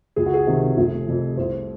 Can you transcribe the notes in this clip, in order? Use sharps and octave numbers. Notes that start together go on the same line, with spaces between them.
C#2 G#4
F#4
G#4
C3 D#3
F1
F2 C3 F3
C2 C5